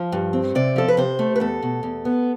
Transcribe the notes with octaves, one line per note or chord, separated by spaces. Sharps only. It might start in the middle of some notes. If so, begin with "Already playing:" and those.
Already playing: F3
G2
C4
C3 D5
F3 A4
B4
C3 C5
A3
B4
E2 A4
B2
E2
B3